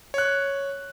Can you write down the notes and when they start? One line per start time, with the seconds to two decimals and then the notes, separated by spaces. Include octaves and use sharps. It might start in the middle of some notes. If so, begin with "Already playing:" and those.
0.14 C#5 F#6